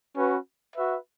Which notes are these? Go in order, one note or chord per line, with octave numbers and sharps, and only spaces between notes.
C#4 F#4 B4
F#4 B4 E5